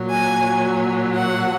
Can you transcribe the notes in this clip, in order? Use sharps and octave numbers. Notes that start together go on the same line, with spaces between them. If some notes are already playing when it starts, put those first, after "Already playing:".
Already playing: A#2 F#3
G#5
F#5